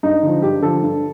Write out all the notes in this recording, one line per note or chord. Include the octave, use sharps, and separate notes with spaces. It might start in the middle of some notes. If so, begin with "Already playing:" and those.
G2 D#4
D3 F3
G2 G4
D3 F3 A4
G2